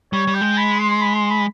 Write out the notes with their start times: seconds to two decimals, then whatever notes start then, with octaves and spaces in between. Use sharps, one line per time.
0.13 G3 C#5
0.27 G3
0.35 G5
0.41 G#3
0.57 B5
0.79 C6
1.01 B5
1.15 C6
1.30 B5